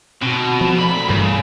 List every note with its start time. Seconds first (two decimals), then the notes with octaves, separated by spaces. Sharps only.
0.22 B2 C4 F#4
0.61 F3
0.79 A3 A#3 D5 B5
1.10 G2 C#3 E3